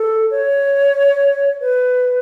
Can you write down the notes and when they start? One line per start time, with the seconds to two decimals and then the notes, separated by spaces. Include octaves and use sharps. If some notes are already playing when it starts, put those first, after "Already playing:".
Already playing: A4
0.31 C#5
1.61 B4